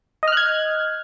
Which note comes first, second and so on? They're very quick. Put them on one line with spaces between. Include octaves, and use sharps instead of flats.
D#5 F6 F#6 G#6